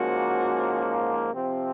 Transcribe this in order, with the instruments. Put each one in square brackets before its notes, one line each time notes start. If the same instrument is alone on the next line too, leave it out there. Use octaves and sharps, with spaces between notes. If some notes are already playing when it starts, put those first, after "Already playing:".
Already playing: [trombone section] G#2 F3 A#3 C#4 [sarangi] F#4
[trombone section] C3 F3 C4